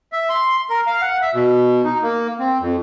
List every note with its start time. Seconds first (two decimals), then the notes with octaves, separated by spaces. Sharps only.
0.13 E5
0.29 C6
0.70 A#4
0.87 F5
1.02 F#5
1.22 E5
1.34 B2
1.84 D#4
2.03 A#3
2.40 C4
2.60 F2